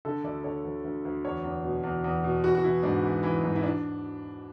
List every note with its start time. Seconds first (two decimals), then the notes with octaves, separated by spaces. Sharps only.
0.05 D3 A4
0.24 D2 D5
0.44 D3 C#5
0.64 D2
0.84 D2
1.05 D2
1.25 E2 C#5
1.44 E2
1.64 B2
1.83 E2
2.04 E2
2.24 B2
2.44 E3 F#4
2.55 F#4
2.64 E3 E4
2.83 G#2 D4
3.03 E3
3.23 E3
3.43 G#2
3.56 E4
3.63 D4